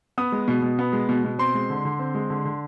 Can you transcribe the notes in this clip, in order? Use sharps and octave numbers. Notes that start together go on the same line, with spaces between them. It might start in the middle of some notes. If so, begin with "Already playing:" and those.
B3 D#6
G#3
B2
B2
B3
G#3
B2
B2
C4 C6
G#3
D3
D3
C4
G#3
D3
D3